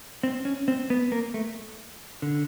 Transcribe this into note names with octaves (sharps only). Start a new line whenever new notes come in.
C4
C#4
C4
B3
A#3
A3
D3